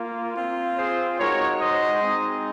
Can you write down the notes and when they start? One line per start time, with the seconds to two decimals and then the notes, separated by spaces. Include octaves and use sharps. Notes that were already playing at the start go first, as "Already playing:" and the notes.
Already playing: A#3 F4
0.35 C4 F4
0.76 G#4 C5
1.18 G#3 D#4 F#4 A#4 C#5
1.59 C5 D#5
2.02 G#3 C4 D#4